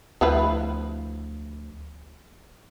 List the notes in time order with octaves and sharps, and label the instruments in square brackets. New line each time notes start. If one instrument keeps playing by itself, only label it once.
[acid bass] D2 [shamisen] F3 E4 B4